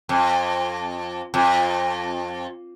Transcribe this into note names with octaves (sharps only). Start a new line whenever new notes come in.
F2
F2